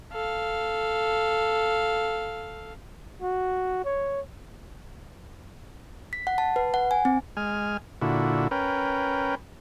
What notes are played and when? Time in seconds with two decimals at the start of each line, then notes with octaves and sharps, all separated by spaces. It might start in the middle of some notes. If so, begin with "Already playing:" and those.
0.12 A4 F5
3.22 F#4
3.85 C#5
6.13 B6
6.27 F#5
6.38 A5
6.56 B4
6.74 F#5
6.91 G#5
7.05 C4
7.37 G#3 G#5 F6
8.02 A#2 D3 E4 F#4
8.51 C#4 A#4 B4 G5